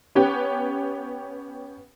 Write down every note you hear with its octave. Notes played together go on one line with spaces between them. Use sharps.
B3 C#4 G4